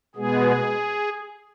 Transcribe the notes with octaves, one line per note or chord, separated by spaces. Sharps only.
B2 G#3 B3 G#4